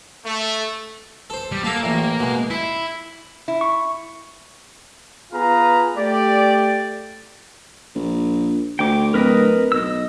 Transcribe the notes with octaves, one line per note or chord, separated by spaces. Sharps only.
A3
A4 C5
G3
A#3 A4 F5 A5
A1 A2
B2 G#3
E4 C6
E4
C#6
B3 F4 G#4 B4 F5 A#5
A3 G4 D5
A#1
D2 G5 D6
D1 A#4 B4 D#5
B1 D#5 E6